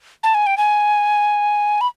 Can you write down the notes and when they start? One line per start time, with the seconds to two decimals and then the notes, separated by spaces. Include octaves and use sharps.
0.23 A5
0.34 G#5
0.46 G5
0.57 G#5
1.81 B5